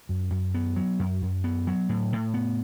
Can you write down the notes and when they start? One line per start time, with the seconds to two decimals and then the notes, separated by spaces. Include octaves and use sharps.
0.09 F#2
0.31 F#2
0.54 B3
0.76 F#3
0.99 F#2
1.22 F#2
1.44 B3
1.67 F#3
1.89 A2
2.13 A2
2.34 B3